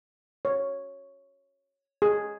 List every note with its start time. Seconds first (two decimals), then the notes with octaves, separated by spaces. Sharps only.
0.45 C#5
2.02 G#4